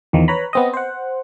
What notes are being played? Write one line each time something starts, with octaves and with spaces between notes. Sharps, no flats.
E2 D#3 F3
B4 C#5 A#5 B5
B3 C4 D#5
C5 F#5